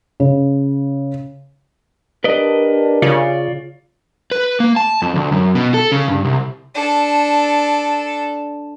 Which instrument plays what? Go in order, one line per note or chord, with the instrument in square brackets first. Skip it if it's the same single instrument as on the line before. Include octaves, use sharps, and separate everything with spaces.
[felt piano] C#3
[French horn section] D4 G4 A#4 [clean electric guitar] B4 D5 D#5
[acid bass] C#3 [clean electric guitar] F4 C#5 D5
[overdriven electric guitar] B4
A#3
A5
F2
D2
F#2
B2
A4
C#3
G2
C2
[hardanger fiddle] D4 A4